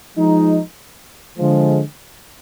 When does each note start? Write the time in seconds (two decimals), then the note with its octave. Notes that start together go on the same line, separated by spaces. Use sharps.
0.16 F3 G#3 D#4
1.38 D3 F3 G#3